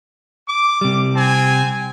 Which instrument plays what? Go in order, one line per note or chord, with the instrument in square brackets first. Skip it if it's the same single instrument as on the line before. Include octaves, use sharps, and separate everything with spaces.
[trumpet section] D6
[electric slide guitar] C3 G3
[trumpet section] C4 G#5